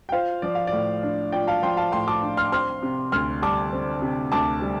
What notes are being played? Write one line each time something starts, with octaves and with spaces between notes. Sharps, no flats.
G5
F4 C5 F5
F3 D5
F5
D5
A2
D4
F4 D5 G5
F5 A5
F3 G5 C6
F5 A5
A2 G5 C6
A5 D6
D4
C6 F6
C4 C6 F6
C3
D2 C6 F6
G3 A5 D6
C4
C3
D2 A5 D6
G3